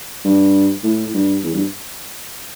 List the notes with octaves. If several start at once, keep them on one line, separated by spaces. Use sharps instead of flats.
G2
A2
G2
E2
G2